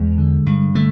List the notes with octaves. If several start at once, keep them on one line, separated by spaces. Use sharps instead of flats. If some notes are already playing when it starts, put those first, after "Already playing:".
Already playing: E2 G#3
D3
G2
D3 A3